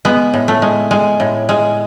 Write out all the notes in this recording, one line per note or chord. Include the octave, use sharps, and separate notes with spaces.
G#3 B3
A2
A3
G#3
G#3
A2
G#3